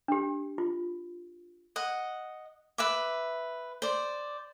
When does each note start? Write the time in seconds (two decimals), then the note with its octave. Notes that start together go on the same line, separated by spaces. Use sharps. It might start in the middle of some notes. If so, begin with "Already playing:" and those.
0.08 D4 G4
0.58 F4
1.76 D#5 F#5
2.78 B4 E5 D6
3.82 C5 D5